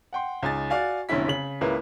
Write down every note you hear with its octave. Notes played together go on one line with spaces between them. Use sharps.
F#5 G5 C6
C#2 D#4 G#5 A6
F#4 D5 F5 G#5
F1 B1 D3 C#4 E4 B6
C#3 F#7
C#2 C#3 A#3 E4 B4